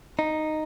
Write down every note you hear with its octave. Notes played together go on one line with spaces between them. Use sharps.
D#4